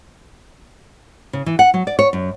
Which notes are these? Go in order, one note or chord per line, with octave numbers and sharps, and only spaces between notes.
C#3
E3
F#5
F#3
D5
C#5
F#2